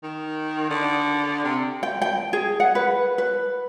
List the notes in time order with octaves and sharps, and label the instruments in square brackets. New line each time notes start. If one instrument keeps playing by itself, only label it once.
[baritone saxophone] D#3
D3
C3
[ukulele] G5
G5
G#4
F#5
B4
B4